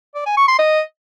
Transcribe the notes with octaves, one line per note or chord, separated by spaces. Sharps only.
D5
G#5
C#6
C6
D#5